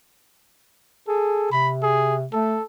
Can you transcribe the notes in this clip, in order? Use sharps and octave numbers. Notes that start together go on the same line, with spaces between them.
G#4 A4
C3 B5
G#4
A3 A4